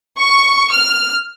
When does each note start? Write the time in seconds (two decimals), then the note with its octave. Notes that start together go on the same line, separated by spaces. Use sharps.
0.19 C#6
0.72 F6